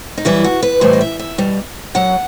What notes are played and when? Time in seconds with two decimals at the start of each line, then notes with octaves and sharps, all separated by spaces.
0.18 D#4
0.25 F#2 E3 G3 E4
0.44 F#4
0.63 B4
0.81 A2 E3 G3 C5
0.93 D#5
1.01 E5
1.19 E5
1.38 B2 G3
1.95 F#2 F#3 F#5